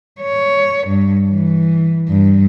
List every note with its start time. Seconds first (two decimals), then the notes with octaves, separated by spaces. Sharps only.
0.21 C#5
0.88 G2
1.29 E3
2.09 G2